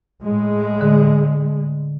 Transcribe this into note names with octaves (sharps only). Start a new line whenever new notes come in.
A2 G#3
D3